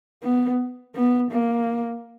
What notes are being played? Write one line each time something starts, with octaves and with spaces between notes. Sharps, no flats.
B3
B3
A#3